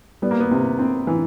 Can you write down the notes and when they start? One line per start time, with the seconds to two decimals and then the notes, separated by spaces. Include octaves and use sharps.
0.22 G3 B3
0.31 A#3
0.40 B3
0.51 C3
0.79 C4
1.07 E3